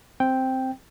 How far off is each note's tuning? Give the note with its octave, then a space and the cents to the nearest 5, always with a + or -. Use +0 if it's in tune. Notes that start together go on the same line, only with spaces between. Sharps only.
C4 +0 G5 +0